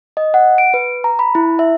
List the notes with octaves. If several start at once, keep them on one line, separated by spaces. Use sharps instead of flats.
D#5
F#5
D7
B4
A#5
B5
E4
E5